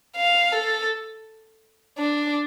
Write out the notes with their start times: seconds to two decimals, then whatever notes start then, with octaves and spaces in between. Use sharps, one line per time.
0.17 F5
0.52 A4
1.99 D4